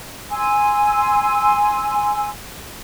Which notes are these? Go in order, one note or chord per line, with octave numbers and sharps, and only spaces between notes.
G#5 C6 E6